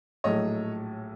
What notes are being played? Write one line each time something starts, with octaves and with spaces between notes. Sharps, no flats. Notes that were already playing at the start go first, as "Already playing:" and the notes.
A#1 A2 F#3 A3 C#5 D#5